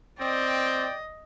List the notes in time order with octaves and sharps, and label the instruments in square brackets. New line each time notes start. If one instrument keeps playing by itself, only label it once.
[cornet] C4 [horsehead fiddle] D5 [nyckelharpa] D#5 [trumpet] G5